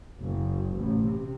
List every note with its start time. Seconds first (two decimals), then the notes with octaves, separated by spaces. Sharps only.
0.20 F#1
0.75 A1
1.04 C3